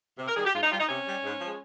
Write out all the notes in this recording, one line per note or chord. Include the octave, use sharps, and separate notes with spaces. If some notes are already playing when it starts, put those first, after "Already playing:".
C3
A#4
D#3 G3 G#4
G4
G#2 F4
D#4
G3 F4
D#4
C3 C#4
G3
G#2
F3 G#3